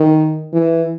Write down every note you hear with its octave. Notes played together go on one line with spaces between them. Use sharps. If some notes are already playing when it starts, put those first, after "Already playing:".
Already playing: D#3
E3